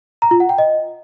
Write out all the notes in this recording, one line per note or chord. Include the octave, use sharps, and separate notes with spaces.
A#5
F4
F#5
G5
D#5